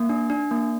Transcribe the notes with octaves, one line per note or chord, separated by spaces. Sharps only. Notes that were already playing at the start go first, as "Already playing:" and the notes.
Already playing: A#3
D4
D4
A#3